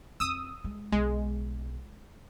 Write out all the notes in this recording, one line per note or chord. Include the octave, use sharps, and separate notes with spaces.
F2 D#6 E6
G#3
B1 G#3